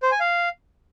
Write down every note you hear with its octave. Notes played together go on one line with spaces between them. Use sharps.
C5
G#5
F5